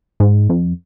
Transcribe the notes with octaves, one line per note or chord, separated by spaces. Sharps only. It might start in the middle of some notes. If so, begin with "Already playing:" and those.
G#2
F2